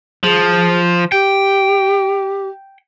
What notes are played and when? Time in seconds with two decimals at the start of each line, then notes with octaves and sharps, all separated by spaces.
0.23 F3 G#4
1.12 G4 G5